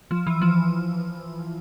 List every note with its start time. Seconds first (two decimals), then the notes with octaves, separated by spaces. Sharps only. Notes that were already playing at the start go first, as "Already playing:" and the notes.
0.11 F3
0.27 E3
0.41 F3